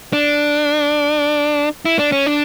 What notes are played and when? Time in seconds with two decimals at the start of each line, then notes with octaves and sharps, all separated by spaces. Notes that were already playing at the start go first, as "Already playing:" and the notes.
0.13 D4
1.85 E4
1.99 D4
2.12 C#4
2.26 D4